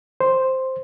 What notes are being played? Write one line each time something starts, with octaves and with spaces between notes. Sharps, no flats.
C5